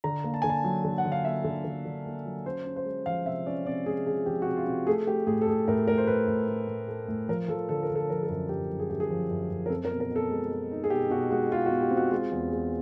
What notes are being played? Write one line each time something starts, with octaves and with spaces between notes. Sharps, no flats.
D3 A#5
A#3
A5
D3 G#5
A5
F#3
D3
F#5
D3
F5
A#3 E5
D3
D3
D3
A#3
F#3
C#4 C5
C#4
C5
G#3
F3 F5
C3 E5
C#4 D5
C3 D5
G#3 G#4
F3 G#4
F3 G4
F#4
C3
F4
C3
A3 G#4
A3 G4
A2 G#4
A4
A2 G#4
A2 A#4
A2 A#4
C5
A2 B4
A2
A2
A2
A3
A2
F3 A#4
F3 A4
D3 A4
A#4
D3
A4
F3 A#4
A4
F#2
F#2 G4
F#2
G#4
F#2 G4
G#4
F3
F#2
F#2
A#4
C4 A4
A#4
B2
A#4
B2 A4
G#3
G#3
D#4
G#4
B2 G4
B2 F#4
G#3 F#4
G#3 F4
F#4
B2
G4
C4
F#4
G#3 F4
E2
G#3